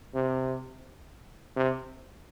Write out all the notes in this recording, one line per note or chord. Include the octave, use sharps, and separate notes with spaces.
C3
C3